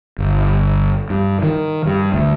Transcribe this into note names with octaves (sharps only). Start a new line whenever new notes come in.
G1
G2
D#3
G2
D2